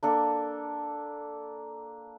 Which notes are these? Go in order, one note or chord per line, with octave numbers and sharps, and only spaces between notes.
A#3 D4 A4